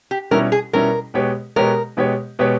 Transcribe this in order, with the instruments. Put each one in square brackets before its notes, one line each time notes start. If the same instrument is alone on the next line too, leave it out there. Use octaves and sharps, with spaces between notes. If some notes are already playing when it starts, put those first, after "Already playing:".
[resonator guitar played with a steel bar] G4
[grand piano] B2 G3 C#4 E4 [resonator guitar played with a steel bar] A#4
[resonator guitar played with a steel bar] G#4
[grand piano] B2 G3 C#4 E4 [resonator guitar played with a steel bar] A#4
[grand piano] B2 G#3 B3 G4 C#5
[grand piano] B2 G#3 B3 G4 C#5 [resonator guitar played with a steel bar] A#4
[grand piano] B2 G#3 B3 G4 C#5
B2 G#3 B3 G4 C#5